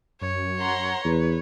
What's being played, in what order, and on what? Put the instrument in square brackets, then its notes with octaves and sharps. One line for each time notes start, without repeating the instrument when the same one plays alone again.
[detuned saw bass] F#2 [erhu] C#5
[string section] F#5 A#5 C6
[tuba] E2 [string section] B4